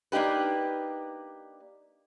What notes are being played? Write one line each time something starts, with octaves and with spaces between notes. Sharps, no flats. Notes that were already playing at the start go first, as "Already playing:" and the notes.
A#3 D4 D#4 G4 B4